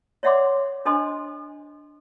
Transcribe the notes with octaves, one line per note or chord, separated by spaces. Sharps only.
C#5 D5 E5 F#5 C6 D6
D4 A4 C5 D#5 G#5 C6